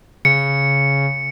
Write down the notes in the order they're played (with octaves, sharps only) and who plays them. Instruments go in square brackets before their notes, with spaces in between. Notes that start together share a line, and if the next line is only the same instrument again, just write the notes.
[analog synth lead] C#3 [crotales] C#7